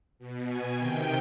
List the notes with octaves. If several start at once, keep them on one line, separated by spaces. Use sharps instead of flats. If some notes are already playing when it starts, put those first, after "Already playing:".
B2
G#5
C3 D#3 G5